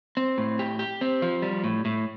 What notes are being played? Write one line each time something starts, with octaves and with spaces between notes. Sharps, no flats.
C4
A2
G4
G4
C4
F3
G3
A2
A2